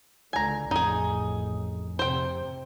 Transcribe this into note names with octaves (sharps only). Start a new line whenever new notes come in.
C#2 D3 G#5 A#5
A1 F2 D#4 G#4
C3 C5 G5